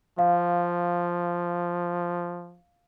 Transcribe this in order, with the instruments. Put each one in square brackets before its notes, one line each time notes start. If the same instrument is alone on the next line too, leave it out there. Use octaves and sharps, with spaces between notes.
[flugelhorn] F3 [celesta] F5